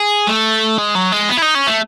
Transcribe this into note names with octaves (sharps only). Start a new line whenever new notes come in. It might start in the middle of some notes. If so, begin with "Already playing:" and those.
Already playing: G#4
A3
G#3
F#3
G#3
B3
E4
D#4
C#4
A3